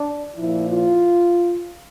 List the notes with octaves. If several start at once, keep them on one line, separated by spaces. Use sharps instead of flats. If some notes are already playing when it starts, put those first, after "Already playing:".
Already playing: D4
A#2 F3 E4
F4